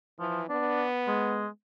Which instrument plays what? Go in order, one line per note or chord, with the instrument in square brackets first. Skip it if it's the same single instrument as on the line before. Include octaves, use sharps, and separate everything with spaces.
[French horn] E3 [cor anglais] F3
[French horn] B3 [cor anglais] D4
[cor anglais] G#3